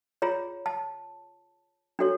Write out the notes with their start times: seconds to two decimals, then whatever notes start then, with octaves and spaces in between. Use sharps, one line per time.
0.22 F4 G#4 C#5 A#5
0.66 A5
1.99 D4 F#4 A4 C#5